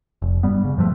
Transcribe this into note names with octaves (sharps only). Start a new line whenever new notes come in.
F1
G2 G3 B3
C#3
G2 F3 F#3 A3